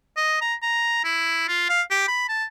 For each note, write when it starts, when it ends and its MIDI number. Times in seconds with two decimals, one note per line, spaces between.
0.17 0.37 75
0.42 0.55 82
0.62 1.04 82
1.04 1.46 64
1.48 1.68 65
1.69 1.82 77
1.91 2.04 67
2.08 2.27 83
2.28 2.45 81